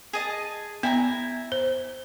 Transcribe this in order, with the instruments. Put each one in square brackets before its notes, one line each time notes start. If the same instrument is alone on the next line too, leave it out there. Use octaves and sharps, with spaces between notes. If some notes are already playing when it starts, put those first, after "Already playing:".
[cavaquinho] G#4 D#5 A5
[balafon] B3 [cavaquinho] E4 G#5 A#5
[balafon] C5